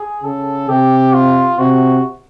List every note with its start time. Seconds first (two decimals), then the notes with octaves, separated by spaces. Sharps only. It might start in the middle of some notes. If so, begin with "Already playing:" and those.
Already playing: G#4
0.24 C#3 A4
0.69 C3 G4
1.13 F4
1.58 C3 F#4